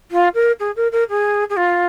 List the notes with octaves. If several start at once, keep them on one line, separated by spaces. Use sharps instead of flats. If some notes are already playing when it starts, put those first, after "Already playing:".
F4
A#4
G#4
A#4
A#4
G#4
G#4
F4